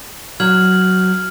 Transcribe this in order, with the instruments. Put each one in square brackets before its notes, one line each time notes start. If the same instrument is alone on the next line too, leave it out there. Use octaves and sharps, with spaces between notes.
[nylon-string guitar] F#3 [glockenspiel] F6 G#6 F#7